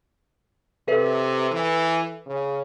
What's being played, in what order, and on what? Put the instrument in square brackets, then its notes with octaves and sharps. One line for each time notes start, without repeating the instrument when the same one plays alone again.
[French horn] C3 [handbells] A4 B4 E5
[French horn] E3
C#3